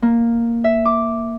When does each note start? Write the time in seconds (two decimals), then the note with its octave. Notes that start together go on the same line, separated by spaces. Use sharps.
0.02 A#3
0.64 E5
0.85 D6